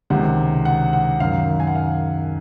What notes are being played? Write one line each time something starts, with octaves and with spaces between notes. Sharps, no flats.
C#2 C3 D#3 F#5
F#5
F#5
F#2 D#3 F5
G#5
F#5
F5